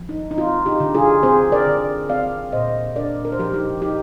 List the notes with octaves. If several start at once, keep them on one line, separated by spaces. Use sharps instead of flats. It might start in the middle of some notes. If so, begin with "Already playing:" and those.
Already playing: F3
D#4
D#4
C4 F4
D#4 G4
D3
F4 G#4
C4 G#4 C5
A#4 D5
D3
C4 D5 F5
A#2 C5 D#5
D4 A#4 D5
A#4
C5
F3 G4 A#4
D#4 G4
D#4 G4